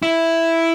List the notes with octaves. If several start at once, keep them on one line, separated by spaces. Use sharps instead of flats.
E4